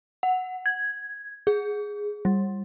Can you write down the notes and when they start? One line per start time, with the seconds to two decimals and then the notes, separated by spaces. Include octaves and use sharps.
0.23 F#5
0.66 G#6
1.47 G#4
2.25 G3